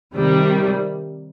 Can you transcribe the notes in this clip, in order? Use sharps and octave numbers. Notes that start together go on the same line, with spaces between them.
C3 D#3 G3